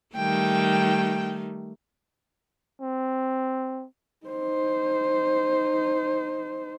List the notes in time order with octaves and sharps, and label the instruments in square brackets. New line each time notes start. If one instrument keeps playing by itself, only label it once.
[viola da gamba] D#3 G3 A3 [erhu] G5
[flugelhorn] C4
[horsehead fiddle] D#4 C5